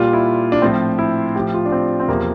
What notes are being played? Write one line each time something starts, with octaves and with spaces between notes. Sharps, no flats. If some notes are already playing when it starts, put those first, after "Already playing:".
Already playing: A#2 G3 F4
E4
D4
A2 F3 C4
E4
A2 F3 G4
F4
D4
C4
C4
E2 C3 F3 A#3